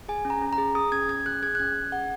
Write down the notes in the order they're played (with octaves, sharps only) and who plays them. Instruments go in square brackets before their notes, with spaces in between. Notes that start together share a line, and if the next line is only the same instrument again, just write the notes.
[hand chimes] G#4 G#5
C#4
A#5
C#4
A#5
G#4
G#4 D#6
C#4 G#6
C#4 G#6
G#4 F#6
G#4 G#6
F#6
C#4 G#6
C#4 G#6
G#4 F#5